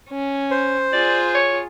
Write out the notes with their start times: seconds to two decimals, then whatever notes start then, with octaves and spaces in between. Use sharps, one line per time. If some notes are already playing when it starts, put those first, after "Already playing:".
0.10 C#4
0.51 C5
0.93 F4 G#4 D5
1.35 C#5